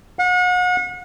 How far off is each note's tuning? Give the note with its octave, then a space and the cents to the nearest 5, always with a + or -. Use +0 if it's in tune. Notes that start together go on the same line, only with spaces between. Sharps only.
F#5 -40